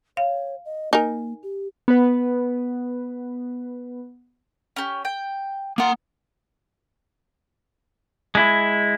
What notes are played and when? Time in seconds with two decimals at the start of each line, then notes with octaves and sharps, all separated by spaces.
0.17 C#5 F5
0.65 D#5
0.93 A#3 D#4 A#4 G#5
1.43 G4
1.88 B3 B4
4.76 C#4 G4
5.05 G5
5.78 A#3 F4 A#4 F#5
8.35 G#3 E4